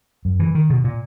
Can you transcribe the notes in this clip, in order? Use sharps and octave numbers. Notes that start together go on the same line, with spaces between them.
F#2
E3
D#3
B2
A#2